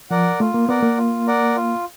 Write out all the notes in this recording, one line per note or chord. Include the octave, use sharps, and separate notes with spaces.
F3 A#4 D5 F#5
A3 F4
A#3
B3 A#4 D5 F#5
A#3
F4
A#4 D5 F#5
F4